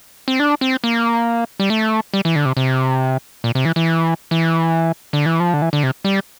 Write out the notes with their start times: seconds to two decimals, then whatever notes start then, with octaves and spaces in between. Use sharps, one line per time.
0.28 C4
0.40 D4
0.61 C4
0.84 A#3
1.60 G3
1.70 A3
2.14 G3
2.25 E3
2.36 D3
2.45 C3
2.57 C3
3.44 A#2
3.55 C3
3.65 E3
3.76 E3
4.31 E3
5.13 D3
5.26 E3
5.40 F3
5.54 D3
5.62 E3
5.73 D3
5.83 C3
6.04 G3